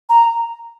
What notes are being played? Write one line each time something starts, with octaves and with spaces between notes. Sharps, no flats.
A#5